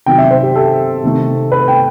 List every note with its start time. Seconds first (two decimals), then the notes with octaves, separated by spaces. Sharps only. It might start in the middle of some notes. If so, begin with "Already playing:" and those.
0.06 C3 D#3 F#3 G5
0.18 E5
0.31 C5
0.43 G4
0.56 A4
1.03 C3 D#3 A3
1.52 B4
1.68 G5